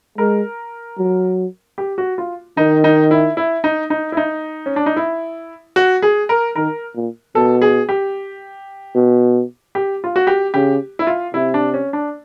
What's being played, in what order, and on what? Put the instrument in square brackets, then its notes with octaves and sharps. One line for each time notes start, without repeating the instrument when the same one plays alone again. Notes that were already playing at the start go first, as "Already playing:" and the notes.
[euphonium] G#3 [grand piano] A#4
[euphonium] F#3
[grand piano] G4
F#4
F4
[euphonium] D#3 [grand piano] D#4
[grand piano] D#4
E4
E4
D#4
D#4
E4
D#4
C#4
D4
D#4
E4
F#4
G#4
A#4
[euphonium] D#3 [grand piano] A#4
[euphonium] A#2
[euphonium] B2 [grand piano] A4
[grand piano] G#4
G4
[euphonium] B2
[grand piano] G4
F4
F#4
G4
[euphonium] C#3 [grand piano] G4
[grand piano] E4
F4
[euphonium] C3 [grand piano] E4
[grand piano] D4
C#4
D4